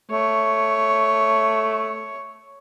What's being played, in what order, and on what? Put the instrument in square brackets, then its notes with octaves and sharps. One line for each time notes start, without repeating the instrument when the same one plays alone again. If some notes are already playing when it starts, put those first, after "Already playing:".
[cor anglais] A3 [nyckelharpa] C#5